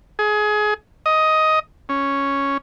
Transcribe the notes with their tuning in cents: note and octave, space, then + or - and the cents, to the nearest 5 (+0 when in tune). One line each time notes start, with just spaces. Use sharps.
G#4 +25
D#5 +10
C#4 +0